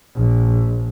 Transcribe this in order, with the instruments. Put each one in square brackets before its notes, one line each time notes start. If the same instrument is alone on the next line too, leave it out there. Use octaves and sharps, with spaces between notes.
[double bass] A#1